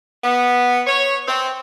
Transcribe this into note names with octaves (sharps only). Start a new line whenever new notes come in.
B3
C#5
C4